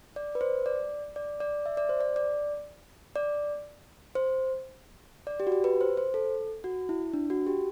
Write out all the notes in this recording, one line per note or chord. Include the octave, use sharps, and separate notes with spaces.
D5
B4
C5
D5
D5
D5
E5
D5
C5
D5
D5
D5
C5
D5
G4
F#4
G4
B4
C5
C5
A4
F#4
E4
D4
F#4
G4